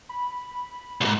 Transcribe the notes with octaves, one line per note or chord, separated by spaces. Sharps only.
B5
C2 G#2